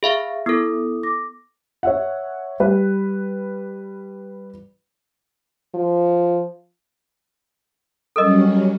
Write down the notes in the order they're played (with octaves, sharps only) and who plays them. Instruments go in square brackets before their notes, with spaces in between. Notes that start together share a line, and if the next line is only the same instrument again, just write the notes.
[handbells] G#4 E5 F5 [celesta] B5
[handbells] B3 A4 [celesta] E4 D#6
[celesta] D6 A#6
[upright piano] C#5 E5 F#5
G3 B4
[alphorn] F3
[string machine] F#3 G3 C#4 [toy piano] A4 A#4 D#5